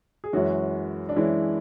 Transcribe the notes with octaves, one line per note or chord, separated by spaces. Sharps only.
G#4
F#2 E3 G#3 C#4 F#4
D4
F#2 E3 G#3 C#4 E4